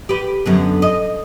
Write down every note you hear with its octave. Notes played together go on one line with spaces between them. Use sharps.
G4 B4
F#2 D3 B3
D#5